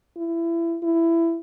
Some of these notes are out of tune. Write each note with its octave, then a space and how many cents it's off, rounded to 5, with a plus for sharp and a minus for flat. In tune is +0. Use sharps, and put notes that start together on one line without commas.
E4 +25
E4 +15